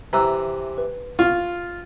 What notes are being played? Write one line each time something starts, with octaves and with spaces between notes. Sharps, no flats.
C3 E3 A#5 E6 F#6
B4
F4 C#6